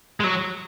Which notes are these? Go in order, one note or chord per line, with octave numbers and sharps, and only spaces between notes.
G#3
F#3